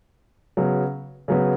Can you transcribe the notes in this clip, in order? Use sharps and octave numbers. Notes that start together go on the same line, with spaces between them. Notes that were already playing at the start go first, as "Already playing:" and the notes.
C#3 F#3 B3
C#3 F#3 B3